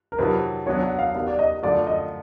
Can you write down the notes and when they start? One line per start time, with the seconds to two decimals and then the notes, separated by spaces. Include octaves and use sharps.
0.12 A#4
0.18 F2 C3 D#3 F#3 B4
0.66 F#3 B3 D4 C#5
0.83 F#5
0.99 F5
1.15 D#3 G3 B3 F5
1.28 D5
1.39 D#5
1.62 F#2 D3 F3 A3 D5
1.87 D#5